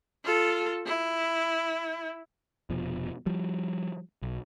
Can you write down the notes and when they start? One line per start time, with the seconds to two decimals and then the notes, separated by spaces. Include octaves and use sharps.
0.24 F4 A4
0.86 E4
2.70 F1 B2 F3
3.26 F3 G3
4.22 B1